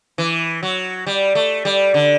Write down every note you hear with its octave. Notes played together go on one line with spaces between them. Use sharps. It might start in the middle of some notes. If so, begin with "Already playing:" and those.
E3
F#3
G3
A3
G3
D3